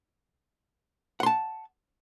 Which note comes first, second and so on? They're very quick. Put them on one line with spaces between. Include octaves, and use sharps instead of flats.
F#5 C6 A5